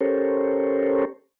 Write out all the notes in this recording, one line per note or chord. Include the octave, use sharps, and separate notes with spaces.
C#4 G4 A4 A#4 C5 C#5